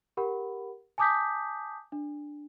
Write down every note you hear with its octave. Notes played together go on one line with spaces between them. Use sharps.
G4 A#4 F#5 B5
G#5 A5 D6 D#6 G6 B6
D4